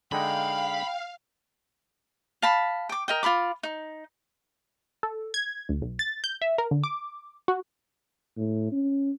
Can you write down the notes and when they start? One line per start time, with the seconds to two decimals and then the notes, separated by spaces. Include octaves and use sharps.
0.12 D3 G#3 D#4 F5 G5 B5
2.42 F5 A5 B5
2.89 G5 D6
3.08 A#4 D#5 G5
3.23 F4 A#4 B5 D6
3.63 D#4
5.03 A4
5.34 G#6
5.69 D2
5.82 B1
5.99 A6
6.24 G6
6.42 E5
6.58 A#4
6.71 D3
6.84 D6
7.48 F#4
8.37 A2
8.72 C#4